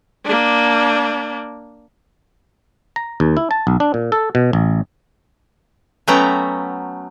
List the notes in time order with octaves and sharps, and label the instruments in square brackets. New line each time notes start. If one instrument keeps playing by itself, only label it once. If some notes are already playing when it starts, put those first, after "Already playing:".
[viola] A#3 D4
[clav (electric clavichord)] A#5
D#2
E4
A5
B1
D4
A#2
A4
B2
A1
[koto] F#3 A3 B3 C#4 G5 A#5